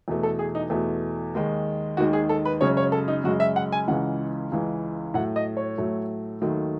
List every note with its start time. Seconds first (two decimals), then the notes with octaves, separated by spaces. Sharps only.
0.08 E2 B2 A3
0.23 A4
0.39 G#4
0.55 D#4
0.70 E2 B2 A3
1.35 D#2 D#3 G#3
1.97 D#2 D#3 G#3 F#4
2.13 G#4
2.29 A4
2.45 B4
2.61 F#2 C#3 G#3 C#5
2.77 C#5
2.92 A4
3.08 D#4
3.24 F#2 C#3 G#3 F#4
3.40 E5
3.56 F#5
3.72 G#5
3.88 C#2 C#3 E3 G#3 F#5
4.52 C#2 C#3 E3 G#3
5.14 A2 F#3 A3 F#5
5.36 D#5
5.57 C#5
5.78 A2 F#3 A3
6.41 D#2 D#3 F#3 A3